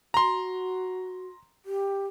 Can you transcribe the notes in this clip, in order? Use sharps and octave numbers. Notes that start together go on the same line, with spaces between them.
F#4 A#5 C6
G4